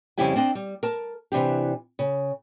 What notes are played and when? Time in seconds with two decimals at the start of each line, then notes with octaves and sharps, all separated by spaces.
0.18 F2 C#3 G3 E4 G4 G#5
0.36 C4 D4 D#5
0.55 G3
0.83 A#4 A5
1.32 C3 E3 D4 G4
1.99 C#3